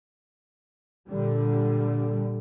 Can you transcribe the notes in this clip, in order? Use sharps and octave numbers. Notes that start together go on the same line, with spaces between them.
A#2 D3 G3